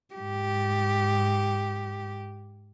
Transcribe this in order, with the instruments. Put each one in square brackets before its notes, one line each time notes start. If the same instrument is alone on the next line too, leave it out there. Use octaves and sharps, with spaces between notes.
[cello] G#2 G4